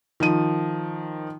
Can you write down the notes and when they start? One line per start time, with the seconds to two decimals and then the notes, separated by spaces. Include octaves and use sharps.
0.20 D#3 F3 D#7